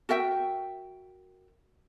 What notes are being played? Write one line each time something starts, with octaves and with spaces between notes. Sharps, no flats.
F#4 A#4 E5 G5